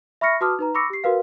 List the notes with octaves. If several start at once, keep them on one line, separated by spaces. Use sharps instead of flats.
E5 B5 C#6 F6 A#6 C#7
F#4 B4 A5 D6 D#6 F6
D#4 B4 A#5
B5 C#6 D6 E6 A#6 C#7
G4 C7
F#4 A#4 B4 F5